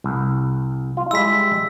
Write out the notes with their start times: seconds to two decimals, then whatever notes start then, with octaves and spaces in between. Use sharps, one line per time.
0.04 C2
0.97 F4
1.11 G3 G#3 E4 E6 B6